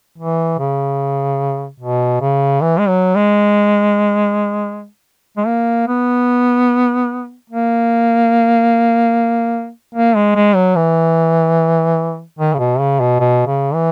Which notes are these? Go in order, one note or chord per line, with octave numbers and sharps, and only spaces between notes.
E3
C#3
B2
C#3
E3
G#3
F#3
G#3
G#3
A#3
B3
A#3
A#3
G#3
G#3
F#3
E3
D#3
C#3
B2
C#3
B2
B2
C#3
E3